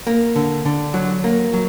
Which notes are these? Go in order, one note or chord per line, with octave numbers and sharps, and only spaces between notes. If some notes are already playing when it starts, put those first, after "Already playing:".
A#3
D3
D3
F#3
A#3
F#3